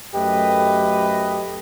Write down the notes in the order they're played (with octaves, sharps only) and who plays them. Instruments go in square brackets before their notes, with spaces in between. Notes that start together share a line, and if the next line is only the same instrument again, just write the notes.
[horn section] F#2 A3 G4 B4 D#5